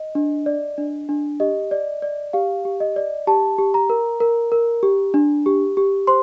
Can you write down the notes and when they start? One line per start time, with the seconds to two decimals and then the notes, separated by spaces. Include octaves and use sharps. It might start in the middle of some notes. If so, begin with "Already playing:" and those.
Already playing: D#5
0.15 D4
0.46 D5
0.78 D4
1.09 D4
1.40 G4 D#5
1.71 D5
2.02 D5
2.33 G4 F5
2.65 G4
2.80 D#5
2.96 D5
3.27 G4 A5
3.58 G4
3.74 A#5
3.90 A#4
4.20 A#4
4.52 A#4
4.83 G4
5.14 D4
5.46 G4
5.77 G4
6.07 C5 C6